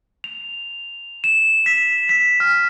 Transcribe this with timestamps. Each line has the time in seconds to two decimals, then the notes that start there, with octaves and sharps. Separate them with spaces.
0.24 F7
1.24 E7
1.66 B6
2.09 B6
2.40 F6